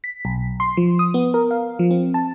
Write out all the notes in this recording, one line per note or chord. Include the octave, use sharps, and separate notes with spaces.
B6
B1
C6
F3
D#6
B3
A#4
F5
F3
C4
A5